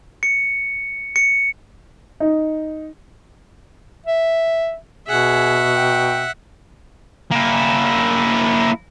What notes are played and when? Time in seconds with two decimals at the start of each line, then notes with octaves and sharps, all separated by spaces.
0.23 C#7
1.16 C#7
2.20 D#4
4.06 E5
5.08 B2 G#4 E5 F#5
5.76 G5
7.31 A#3 E4